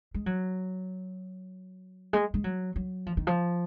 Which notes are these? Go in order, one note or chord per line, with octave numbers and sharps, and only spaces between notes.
G#3
F#3
G#3
G#3
F#3
F#3
F3
D#3
F3